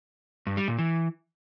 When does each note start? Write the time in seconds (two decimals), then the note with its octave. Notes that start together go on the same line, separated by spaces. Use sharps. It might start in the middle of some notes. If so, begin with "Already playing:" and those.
0.47 G2
0.57 G3
0.68 A#2
0.78 E3